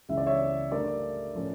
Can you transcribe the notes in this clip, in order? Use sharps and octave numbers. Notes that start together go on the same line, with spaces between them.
C#2 C#3 E3 E5
D5
C#5 E5
G2 D3 A3 A#4 D5
A2 F3 A3 C#4